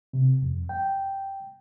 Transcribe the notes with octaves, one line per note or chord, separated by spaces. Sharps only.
C3
F2
G5